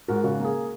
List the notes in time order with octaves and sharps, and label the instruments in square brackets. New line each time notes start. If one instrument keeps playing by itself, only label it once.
[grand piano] G#2 F#4 A#4
C#3 F#4
A#3
G#4